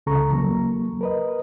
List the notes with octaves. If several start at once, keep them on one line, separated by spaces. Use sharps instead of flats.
C#2 C#3 A4 A#5 C#6
E2 F#3 A#3
A#4 B4 D#5